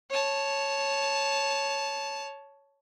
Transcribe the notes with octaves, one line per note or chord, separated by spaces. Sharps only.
C#5 A5